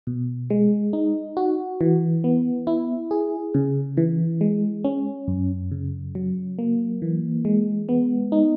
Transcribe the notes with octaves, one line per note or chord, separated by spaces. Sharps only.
B2
G#3
D#4
F#4
E3
B3
E4
G#4
C#3
E3
G#3
C#4
F#2
C#3
F#3
A#3
E3
G#3
B3
D#4